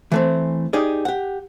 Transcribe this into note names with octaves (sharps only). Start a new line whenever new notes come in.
E3 A3 C4
D#4 G4 G#4 D5
G4 F#5